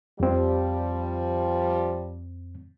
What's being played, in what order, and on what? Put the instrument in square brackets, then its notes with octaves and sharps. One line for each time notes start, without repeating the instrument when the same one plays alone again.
[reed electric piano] F2 C4 [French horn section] F3 G3